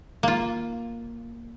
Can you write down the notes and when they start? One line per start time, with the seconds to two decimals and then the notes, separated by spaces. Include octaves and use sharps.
0.23 A#3 F4